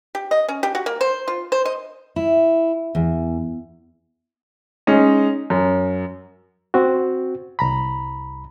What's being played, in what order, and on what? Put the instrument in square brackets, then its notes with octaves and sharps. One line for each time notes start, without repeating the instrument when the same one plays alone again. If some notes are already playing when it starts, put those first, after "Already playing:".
[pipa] G4
D#5
C#4
G4
F#4
A#3
C5
F4
C5
D#5
[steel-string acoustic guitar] E4
E2
[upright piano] G#3 C#4 D#4
F#2
[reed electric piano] C4 F#4
C2 A#5 B5